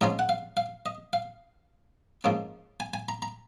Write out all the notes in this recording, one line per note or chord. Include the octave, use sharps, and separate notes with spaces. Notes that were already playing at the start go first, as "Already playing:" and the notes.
G#2 F3 G#3 C#4 A#5
F#5
F5
F5
D#5
F5
G#2 F3 A#3 C#4
G#5
G#5
A#5
A#5